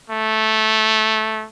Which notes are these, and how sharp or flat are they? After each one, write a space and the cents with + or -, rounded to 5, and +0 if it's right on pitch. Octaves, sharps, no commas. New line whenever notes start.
A3 -10